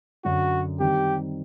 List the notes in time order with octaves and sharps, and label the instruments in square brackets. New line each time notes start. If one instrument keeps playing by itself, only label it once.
[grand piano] F#2 D3 F#3 [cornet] F#4
[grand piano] D#3 G3 C4 [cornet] G4